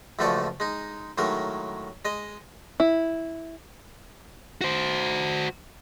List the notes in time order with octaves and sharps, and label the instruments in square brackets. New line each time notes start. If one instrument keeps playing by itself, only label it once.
[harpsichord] C#2 F#2 F3 A3 D5 C#6
G#3 D#4
A2 D#3 F#3 G#3 A#4
G#3 D#5
[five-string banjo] E4
[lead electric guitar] F#4 C5